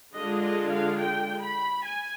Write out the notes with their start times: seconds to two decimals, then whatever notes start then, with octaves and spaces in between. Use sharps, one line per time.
0.14 D3 G#3 D4 F4 D#5
0.42 D#5
0.71 F5
1.00 G5
1.42 B5
1.85 G#5